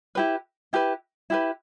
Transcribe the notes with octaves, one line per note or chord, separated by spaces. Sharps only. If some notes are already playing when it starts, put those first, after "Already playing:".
E4 G4 B4
E4 G4 B4
E4 G4 B4